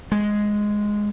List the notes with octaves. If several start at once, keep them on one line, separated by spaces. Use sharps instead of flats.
G#3